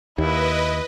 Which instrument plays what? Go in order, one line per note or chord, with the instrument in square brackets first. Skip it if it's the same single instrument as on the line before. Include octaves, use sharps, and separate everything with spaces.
[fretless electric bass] D#2 [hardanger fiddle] E4 [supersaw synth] B4 D#5